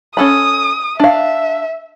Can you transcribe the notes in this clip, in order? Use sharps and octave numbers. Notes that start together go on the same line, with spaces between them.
C#4 A4 B5 D#6
D4 E5 F5